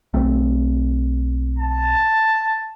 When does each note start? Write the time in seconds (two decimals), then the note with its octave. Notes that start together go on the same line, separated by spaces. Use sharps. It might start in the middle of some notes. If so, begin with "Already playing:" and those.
0.14 B1 A3 C4
1.58 A5